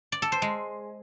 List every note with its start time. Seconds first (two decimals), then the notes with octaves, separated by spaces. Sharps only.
0.12 D5
0.22 A4
0.32 C5
0.42 G#3